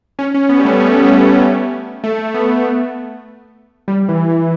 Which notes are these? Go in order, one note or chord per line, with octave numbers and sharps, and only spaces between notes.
C#4
C#4
B3
G3
A3
C#4
B3
C#4
A3
B3
G3
E3
E3